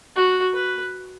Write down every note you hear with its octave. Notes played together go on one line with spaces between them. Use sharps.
F#4
B4